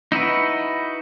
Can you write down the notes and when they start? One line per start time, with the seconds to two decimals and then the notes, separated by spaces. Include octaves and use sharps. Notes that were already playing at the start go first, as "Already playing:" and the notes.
0.12 D#4 E4 F#4 B4